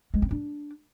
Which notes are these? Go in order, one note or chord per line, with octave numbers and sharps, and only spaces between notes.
G#3
C4
D4